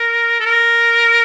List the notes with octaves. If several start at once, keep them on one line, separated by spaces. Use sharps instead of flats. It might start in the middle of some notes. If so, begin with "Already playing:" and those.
Already playing: A#4
A4
A#4